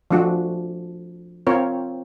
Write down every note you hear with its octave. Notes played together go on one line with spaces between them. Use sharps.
F3 A3 D4 F#4
C4 F4 A#4 C#5